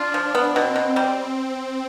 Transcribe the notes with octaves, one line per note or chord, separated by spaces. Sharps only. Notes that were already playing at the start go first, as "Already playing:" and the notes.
Already playing: D4 F4
F3
B3
B2 C4
B2
G3